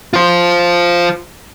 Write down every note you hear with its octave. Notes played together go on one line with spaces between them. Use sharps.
F4 C5